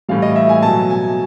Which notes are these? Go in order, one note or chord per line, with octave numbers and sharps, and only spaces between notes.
A2 E3 G3 F5
D#5
E5
G#5
B2 F#3 A5
G#5